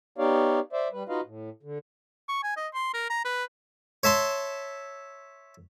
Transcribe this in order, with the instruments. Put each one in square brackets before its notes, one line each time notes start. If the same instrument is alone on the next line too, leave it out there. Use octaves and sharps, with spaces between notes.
[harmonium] B3 D#4 G4 C#5 D5 F5
C5 D5 E5
G3 B4
D#4 F4 F#4 B4 D#5 F5
A2
D3
[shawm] C#6
G#5
D#5
C6
A#4
A#5
B4
[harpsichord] C#5 E5 A5 C6